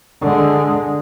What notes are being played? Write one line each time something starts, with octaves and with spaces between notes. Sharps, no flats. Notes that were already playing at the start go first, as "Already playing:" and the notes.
D3 G#3